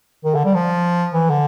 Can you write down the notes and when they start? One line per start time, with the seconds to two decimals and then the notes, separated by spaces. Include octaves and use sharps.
0.24 D#3
0.35 D3
0.44 G3
0.55 F3
1.14 E3
1.29 D3